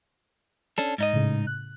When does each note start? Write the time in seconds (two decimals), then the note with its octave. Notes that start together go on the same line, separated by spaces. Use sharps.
0.78 C#4 D4 A4
0.98 G#2 D#4 D#5
1.13 A2 C#3
1.47 F#6